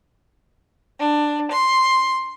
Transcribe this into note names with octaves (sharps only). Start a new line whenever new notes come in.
D4
C6